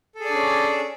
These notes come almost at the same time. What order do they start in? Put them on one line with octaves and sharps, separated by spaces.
A4 G#4 D5 D4 C#4